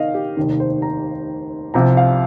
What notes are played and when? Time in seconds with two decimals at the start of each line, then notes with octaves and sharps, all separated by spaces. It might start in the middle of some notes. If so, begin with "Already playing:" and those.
Already playing: D#3 D#5 F5
0.14 G4
0.37 F1 D#2 D#3
0.60 C5
0.82 A#5
1.74 C2 C3 F3 A#5
1.97 F5